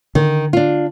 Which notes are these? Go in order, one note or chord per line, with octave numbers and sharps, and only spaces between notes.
D3 D#3
D4 F4